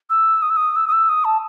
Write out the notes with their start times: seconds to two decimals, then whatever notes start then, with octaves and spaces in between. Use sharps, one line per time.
0.10 E6
0.42 D#6
0.50 E6
0.57 D#6
0.76 E6
0.87 D#6
0.92 E6
1.09 D#6
1.25 A5